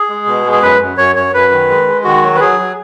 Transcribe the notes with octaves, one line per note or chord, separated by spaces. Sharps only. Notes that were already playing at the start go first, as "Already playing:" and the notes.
Already playing: G#4
G#3
B2
G#3
G#4
F#2 B4
F#2
F#2 C#5
F#2 C#5
F#2 B4
D#3
G#3
G#3
D#3 F#4
F#3
B4
F#3 G#4
F#3